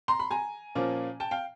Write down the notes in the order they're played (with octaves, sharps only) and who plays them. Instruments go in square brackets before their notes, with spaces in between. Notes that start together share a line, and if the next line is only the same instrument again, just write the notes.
[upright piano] A#5 C6
B5
G#5 A#5
A#2 F3 A#3 C#4
G5 A5
F5 G5